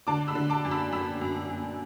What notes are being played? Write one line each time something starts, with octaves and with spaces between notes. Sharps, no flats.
D3 A5 D6
B5 E6
D3
A5 D6
F#2
B5 E6
F#2 B5 E6
F#2
F#2